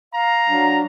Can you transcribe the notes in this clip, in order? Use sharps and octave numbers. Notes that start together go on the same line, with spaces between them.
F5 A#5
F#3 D4